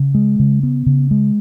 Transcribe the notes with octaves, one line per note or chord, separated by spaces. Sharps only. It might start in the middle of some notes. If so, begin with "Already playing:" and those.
Already playing: C#3
G#3
C#3
B3
C#3
G#3